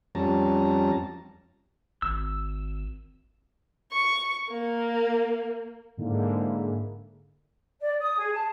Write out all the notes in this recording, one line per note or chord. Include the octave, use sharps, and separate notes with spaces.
F2 G3 C#4 A5 A#5
G#1 E6
C#6
A#3
G#2 D3 A#3 E4
D5
D#6
G#4
A5